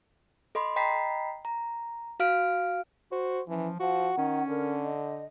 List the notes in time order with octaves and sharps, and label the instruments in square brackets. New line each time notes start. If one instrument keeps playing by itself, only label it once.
[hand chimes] A4 D#5 B5 C6
D#5 G5 A#5 B5 B6 C7
A#5
F#4 F5 F6 D7
[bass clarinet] F#4 [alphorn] C5
[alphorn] E3 [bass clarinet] F3 [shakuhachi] C#4
[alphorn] F3 [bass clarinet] F#4 [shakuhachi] F#5
[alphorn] D#3 [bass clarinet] C#4
[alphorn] D3 [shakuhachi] A#4
[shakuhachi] D#5